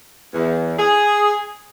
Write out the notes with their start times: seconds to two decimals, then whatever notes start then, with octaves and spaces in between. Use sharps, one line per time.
0.33 E2
0.79 G#4